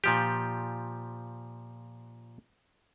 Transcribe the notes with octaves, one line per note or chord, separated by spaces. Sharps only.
A#2 F3 G4